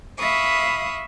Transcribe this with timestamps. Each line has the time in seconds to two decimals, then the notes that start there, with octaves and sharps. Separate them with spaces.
0.17 E5 F5 B5 C#6 D#6